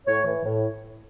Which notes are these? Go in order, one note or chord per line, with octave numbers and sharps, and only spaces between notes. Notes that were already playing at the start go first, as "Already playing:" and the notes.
A2 C#5
E3
A2